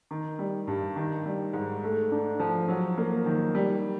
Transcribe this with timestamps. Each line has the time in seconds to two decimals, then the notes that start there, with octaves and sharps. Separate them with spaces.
0.11 D#3
0.39 G3
0.67 G2
0.96 D#3
1.26 G3
1.53 G#2
1.83 A3
2.11 D4
2.40 F3
2.68 F#3
2.97 A#3
3.26 D#3
3.55 G3